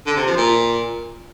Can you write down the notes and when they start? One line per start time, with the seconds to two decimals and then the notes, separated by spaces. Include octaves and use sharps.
0.06 D3
0.16 C3
0.27 F3
0.37 A#2